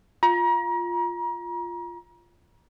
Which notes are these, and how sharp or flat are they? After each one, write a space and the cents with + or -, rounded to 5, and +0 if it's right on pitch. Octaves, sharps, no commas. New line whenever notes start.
F4 +0 A#5 +35